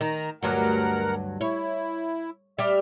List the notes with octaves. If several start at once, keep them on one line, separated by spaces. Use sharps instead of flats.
D#3 A#5
D2 G2 F#3 A#4 F#5
E4 C#5
G3 G4 E5 F6